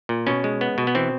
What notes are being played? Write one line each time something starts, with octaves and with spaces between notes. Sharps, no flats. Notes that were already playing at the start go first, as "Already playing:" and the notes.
A#2
B2 C#4
G#3
B3
B2
B3
E3 C4